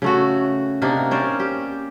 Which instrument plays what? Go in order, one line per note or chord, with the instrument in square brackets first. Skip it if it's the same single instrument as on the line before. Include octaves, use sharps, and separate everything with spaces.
[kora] C#3 A3 F#4
C3 A#3 D4 D#4
C#4 A#4 C5 D5
G4